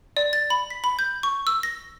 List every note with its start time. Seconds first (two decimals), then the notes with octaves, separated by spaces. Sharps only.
0.17 D5
0.33 A6
0.50 B5
0.70 B6
0.84 B5
0.99 G6
1.23 C#6
1.47 E6
1.63 A#6